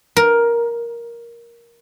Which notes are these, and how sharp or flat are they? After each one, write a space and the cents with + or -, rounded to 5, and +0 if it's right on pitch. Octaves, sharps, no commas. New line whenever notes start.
A#4 +10